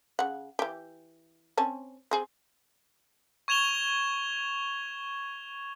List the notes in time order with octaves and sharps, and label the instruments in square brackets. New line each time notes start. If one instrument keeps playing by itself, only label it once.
[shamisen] C#3 F#5
E3 G4
C4 C#4 A5
C4 G#4
[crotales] C#6 G#6 E7 F7 G7